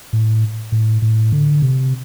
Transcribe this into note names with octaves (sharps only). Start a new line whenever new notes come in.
A2
A2
A2
D3
C3